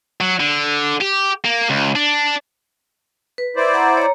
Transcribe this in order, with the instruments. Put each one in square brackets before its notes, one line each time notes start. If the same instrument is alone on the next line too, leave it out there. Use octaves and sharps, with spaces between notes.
[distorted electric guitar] F#3
D3
G4
A#3
C#2
D4
[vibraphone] B4
[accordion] E4 C5 D5
[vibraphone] F#5 A#5
C#5 A#5